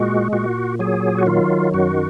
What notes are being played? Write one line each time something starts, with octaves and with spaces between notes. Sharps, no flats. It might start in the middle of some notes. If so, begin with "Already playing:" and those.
Already playing: A#2 G#3 F#4
A#2 F#4
F#3 G#4
F#4
D#3 F4
F#2 F#4